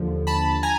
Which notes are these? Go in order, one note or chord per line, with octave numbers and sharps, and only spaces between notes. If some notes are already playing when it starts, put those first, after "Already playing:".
Already playing: D#2 D3 F3
A5 B5
G#5 A#5